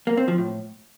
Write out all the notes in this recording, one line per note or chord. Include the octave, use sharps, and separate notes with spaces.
A#3
C4
F3
A2